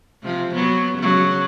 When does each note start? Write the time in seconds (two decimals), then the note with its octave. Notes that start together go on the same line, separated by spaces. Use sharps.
0.23 C3 F3
0.54 F#3 B3
0.98 C#3 F#3